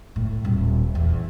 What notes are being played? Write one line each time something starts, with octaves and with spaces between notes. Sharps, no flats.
A2
D#1
E2